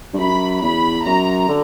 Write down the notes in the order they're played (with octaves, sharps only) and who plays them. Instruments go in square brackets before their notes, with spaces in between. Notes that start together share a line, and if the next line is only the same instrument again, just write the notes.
[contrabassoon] G2
[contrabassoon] F#2 [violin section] B5
[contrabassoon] E2 [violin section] B5
[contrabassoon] F#2 [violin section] A#5
[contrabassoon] D3